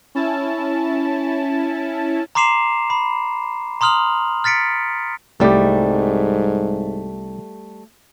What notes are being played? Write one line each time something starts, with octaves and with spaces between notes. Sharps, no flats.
C#4 E4 A5
A#5 C6 D6 C7 E7 F7
B5
A#5 C6 D#6 F6 F7 F#7
F6 A6 B6 C#7 D7
C2 G#2 G3 A3 G4